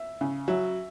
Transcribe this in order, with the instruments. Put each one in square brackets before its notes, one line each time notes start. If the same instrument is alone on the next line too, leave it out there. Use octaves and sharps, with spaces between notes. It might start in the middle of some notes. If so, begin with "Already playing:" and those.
Already playing: [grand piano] E5
[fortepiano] C#3
[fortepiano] F#3 [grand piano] E5